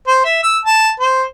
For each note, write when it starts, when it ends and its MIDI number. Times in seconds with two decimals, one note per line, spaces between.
0.08 0.22 72
0.25 0.39 76
0.43 0.58 88
0.65 0.90 81
1.00 1.24 72